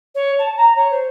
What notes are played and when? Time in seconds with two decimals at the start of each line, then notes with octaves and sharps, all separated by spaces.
0.14 C#5
0.38 A5
0.56 A#5
0.75 C#5
0.90 C5